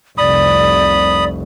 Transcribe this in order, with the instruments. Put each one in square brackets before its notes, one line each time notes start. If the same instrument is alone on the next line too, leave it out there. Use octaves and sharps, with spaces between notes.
[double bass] F1 C2 [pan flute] D5 [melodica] B5 D#6